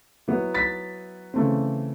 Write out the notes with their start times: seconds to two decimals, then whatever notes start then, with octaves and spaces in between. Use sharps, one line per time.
0.28 F#3 B3 E4
0.54 A6 B6
1.34 C#3 E3 A3 C4